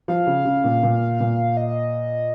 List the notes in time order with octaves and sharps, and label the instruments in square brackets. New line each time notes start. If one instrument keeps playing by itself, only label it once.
[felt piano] F3 [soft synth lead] F5
[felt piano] C#3
C#3
A#2
A#2
A#2
[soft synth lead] D#5